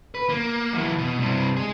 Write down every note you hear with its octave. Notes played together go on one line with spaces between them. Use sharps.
B4
A#3
E3 F#3
B2
G2 C3
G#3 G#4